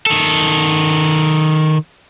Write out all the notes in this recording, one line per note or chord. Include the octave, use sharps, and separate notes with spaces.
D#3 A4